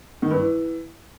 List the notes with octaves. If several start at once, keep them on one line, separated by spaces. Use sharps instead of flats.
D#3
G2
E3